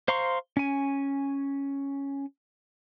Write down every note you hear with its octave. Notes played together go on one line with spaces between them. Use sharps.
C5 F5 A#5 C6 C#6
C#4 G#5